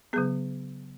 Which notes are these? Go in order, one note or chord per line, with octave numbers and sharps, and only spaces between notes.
C#3 F#3 B3 G#4